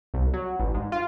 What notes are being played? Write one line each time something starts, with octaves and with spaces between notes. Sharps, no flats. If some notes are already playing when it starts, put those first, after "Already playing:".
C2
F#3
A1
G#2
F4